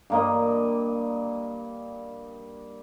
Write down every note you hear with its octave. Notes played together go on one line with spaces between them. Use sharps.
G2 A#3 D#5